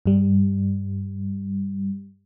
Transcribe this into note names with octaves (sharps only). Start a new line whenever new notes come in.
G2 G3